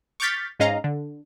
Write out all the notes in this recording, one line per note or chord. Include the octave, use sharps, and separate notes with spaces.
C#6 D6 F6 G6 A6 B6
G#2 G#3 C#4 D#5 F5 A#5
D3